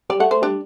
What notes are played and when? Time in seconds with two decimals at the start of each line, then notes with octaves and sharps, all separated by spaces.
0.10 G3 D5
0.20 A3 F#5
0.31 A3 C5
0.42 G3 D4